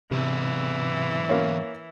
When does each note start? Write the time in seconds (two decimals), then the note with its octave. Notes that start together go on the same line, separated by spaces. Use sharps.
0.11 E2 G#2 C3 E3
1.29 A#3 C#4